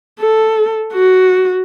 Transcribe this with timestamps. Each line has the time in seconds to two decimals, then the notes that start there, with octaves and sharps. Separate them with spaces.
0.20 A4
0.93 F#4